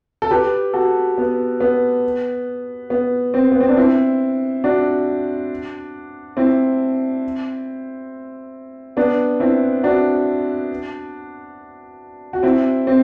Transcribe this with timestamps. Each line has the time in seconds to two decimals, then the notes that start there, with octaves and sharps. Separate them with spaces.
0.22 A4
0.31 G4 B4
0.73 F#4 A4
1.18 B3
1.60 B3
2.90 B3
3.34 C4
3.52 B3
3.60 C4
3.69 D4
3.77 C4 E4
4.64 D4 F#4
6.37 C4 E4
8.97 B3 D4
9.40 C4 E4
9.83 D4 F#4
12.33 F#4
12.43 C4 E4
12.87 C4